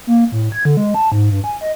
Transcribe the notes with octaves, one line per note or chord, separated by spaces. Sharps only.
A#3
A2
G#6
D3
G#3
A5
G#2
G2
G#5
D#5